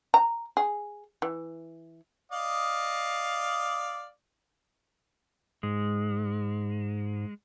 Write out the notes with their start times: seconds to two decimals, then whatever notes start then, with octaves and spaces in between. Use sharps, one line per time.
0.14 A#5
0.57 G#4
1.22 E3
2.32 D5 D#5 F5
5.63 G#2 G#3